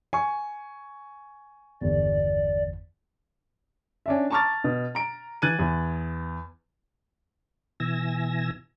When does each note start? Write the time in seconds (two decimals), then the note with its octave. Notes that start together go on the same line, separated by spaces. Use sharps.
0.13 G#5 C#6
1.81 G1 E2 D5
4.06 C#4 D4 E5
4.30 A5 A#5 C#6 D6 F6 A6
4.64 B2
4.95 A#5 D7
5.42 E3 F#6 G#6 A6 D#7
5.59 E2
7.80 B2 E3 G#5 E6 A#6